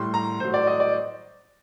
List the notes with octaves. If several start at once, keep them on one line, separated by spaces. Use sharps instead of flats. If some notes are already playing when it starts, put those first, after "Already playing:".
Already playing: A2 G3 C6
A#5
A2 F#3 C5
D5
D#5
D5